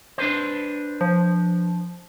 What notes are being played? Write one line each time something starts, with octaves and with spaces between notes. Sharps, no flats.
D4 B4 C5
F3